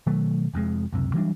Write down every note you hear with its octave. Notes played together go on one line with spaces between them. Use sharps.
B2 D#3 F#3 A3
F1 F2 A2 G#3
C#2 F#2 C3
E3 F#3 G3 D4